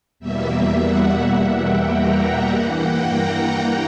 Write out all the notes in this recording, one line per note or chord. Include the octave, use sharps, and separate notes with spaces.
E2 B2 G3 A#3 E5
F#5
F#5
G5
A#5
G5
G2 E3 A#3 F#5
G5
A#5